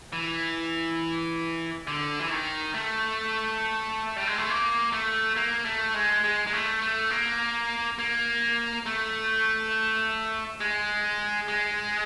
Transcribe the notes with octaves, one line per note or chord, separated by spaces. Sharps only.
E3
D3
E3
D#3
A3
G3
G#3
A3
A#3
A3
A#3
A3
G#3
G#3
G#3
A3
A3
A#3
A#3
A3
G#3
G#3